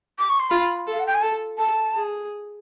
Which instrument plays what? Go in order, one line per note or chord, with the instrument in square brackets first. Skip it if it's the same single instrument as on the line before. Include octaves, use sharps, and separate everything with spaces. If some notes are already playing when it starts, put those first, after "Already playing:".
[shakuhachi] D6
C#6
C6
[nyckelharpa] F4 [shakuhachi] B5
[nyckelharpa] A4
[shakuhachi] F5
F#5
G5
G#5
[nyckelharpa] A4 [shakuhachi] A5
[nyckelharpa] A4 [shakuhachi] A5
[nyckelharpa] G#4